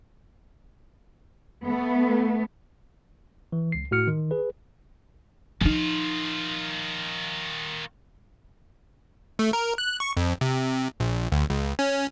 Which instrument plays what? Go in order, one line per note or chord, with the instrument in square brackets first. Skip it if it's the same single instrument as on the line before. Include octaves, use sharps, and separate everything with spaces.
[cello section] A3 B3
[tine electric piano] E3
C#2 C7
A2 F#4 F6 C#7
D#3
G#4 B4
[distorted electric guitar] D#3 F4 [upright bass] F3 D#4
[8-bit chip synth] A3
A#4
F#6
C#6
F2
C3
A#1
D2
C#2
C#4